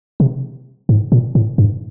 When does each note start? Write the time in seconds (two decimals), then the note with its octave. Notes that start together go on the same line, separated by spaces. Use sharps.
0.20 C3
0.89 G#2
1.12 A#2
1.35 A2
1.58 G2